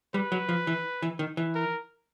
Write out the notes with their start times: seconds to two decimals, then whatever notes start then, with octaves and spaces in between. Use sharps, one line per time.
0.14 G3 B4
0.32 F#3
0.49 F3
0.67 E3
1.02 E3
1.19 D#3
1.37 E3
1.55 A#4